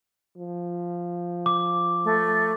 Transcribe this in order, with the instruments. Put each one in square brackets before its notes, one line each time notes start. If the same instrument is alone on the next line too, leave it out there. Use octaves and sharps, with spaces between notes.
[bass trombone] F3
[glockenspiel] D6
[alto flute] A3